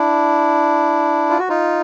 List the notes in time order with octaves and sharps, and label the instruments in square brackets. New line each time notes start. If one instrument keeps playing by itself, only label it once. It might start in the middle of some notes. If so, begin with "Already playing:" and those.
Already playing: [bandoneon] D4 E4
F4
F#4
D#4 F4